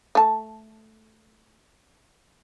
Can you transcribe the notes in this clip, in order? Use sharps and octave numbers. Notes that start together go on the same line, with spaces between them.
A3 A5